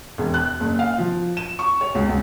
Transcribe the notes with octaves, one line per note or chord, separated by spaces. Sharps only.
E1
F#6
F#1
F5
F3
E7
C#6
C#5
C#2
C#2